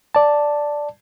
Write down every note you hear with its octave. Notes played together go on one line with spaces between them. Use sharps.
D5 A5